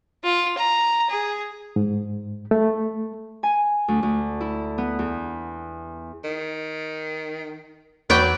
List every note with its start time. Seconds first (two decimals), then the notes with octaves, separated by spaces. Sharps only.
0.24 F4
0.58 A#5
1.10 G#4
1.76 G#2
2.51 A3
3.43 G#5
3.88 D2
4.03 D2
4.41 E4
4.78 B3
4.99 E2
6.24 D#3
8.10 E2 F#3 B4 D5 G5 C#6